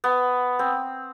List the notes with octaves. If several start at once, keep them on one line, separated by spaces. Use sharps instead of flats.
B3
C4